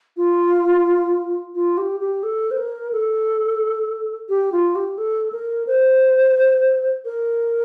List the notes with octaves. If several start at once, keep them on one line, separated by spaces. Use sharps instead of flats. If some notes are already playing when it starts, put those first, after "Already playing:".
F4
F4
G4
G4
A4
C5
A#4
A4
G4
F4
G4
A4
A#4
C5
A#4